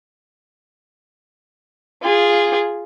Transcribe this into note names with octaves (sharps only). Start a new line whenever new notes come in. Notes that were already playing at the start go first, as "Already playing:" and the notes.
F4 G#4